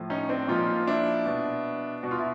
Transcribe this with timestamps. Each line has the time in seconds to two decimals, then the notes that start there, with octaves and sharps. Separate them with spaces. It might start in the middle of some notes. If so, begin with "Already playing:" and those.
Already playing: A2 F3
0.10 C#4 D#4
0.29 C4 D4
0.48 A#2 F3 D#4 F4
0.87 D4 E4
1.26 B2
2.03 B2 F#4
2.11 F4
2.19 E4